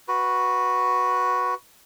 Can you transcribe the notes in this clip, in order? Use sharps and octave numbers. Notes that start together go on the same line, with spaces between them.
F#4 B4